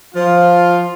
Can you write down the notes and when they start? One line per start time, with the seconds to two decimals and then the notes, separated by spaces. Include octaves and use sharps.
0.15 F3 F4